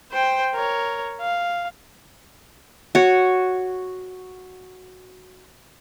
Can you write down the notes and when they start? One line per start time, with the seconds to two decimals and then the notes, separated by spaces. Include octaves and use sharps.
0.12 C5 G5
0.54 A#4 C#5
1.21 F5
2.95 F#4 C#5